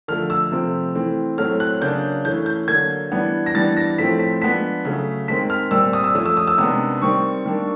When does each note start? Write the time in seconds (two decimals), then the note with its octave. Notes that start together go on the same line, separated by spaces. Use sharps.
0.08 D3 F3 A3 F6
0.30 E6
0.52 C3 F3 A3 C4
0.95 E3 A3 C4
1.38 A2 F#3 A3 C4 F6
1.60 F#6
1.81 C#3 F#3 A#3 D4 G6
2.24 E3 A3 C#4 G6
2.46 G6
2.68 D3 F#3 A#3 G#6
3.11 E3 G3 B3 D4
3.46 A#6
3.55 E3 G3 B3 D4 A6
3.77 A#6
3.98 A2 F3 A3 C4 B6
4.19 B6
4.42 F3 G#3 B3 D4 B6
4.85 C#3 F#3 A3
5.28 D#3 G#3 C4 B6
5.50 F6
5.71 A#2 G3 C4 E6
5.93 D#6
6.04 E6
6.15 F3 A3 C#4 D#6
6.26 E6
6.37 D#6
6.47 E6
6.58 C3 D#3 G#3 B3 D4 D#6
7.02 D#3 G3 C4 C#6
7.45 D#3 G3 A#3 D4